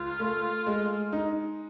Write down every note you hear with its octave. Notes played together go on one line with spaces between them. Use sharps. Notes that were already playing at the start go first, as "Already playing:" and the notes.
Already playing: C#2 F4
A3
G#3
D#4